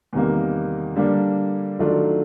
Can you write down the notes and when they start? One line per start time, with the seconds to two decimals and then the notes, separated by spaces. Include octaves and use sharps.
0.13 E2 C3 D#3 G3 A#3
0.96 D3 G3 A#3 D4
1.79 D#3 F#3 A3 D4 F4